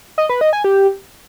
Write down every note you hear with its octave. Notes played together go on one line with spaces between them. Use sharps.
D#5
B4
D#5
G#5
G4